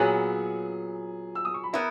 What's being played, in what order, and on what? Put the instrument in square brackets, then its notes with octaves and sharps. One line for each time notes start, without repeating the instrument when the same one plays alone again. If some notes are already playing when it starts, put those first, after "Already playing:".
Already playing: [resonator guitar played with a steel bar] A#2 F#3 B3 [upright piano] G#4 G#5
[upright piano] E6
D#6
C#6
B5
[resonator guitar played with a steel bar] B3 E4 [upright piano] A#4 A#5